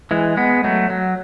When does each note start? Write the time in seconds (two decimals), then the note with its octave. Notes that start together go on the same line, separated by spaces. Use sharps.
0.11 E3 G#3
0.37 G#3 B3
0.64 F#3 A3
0.90 F#3